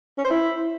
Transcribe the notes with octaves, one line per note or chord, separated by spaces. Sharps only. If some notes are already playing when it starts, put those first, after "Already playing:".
C#4
C5
E4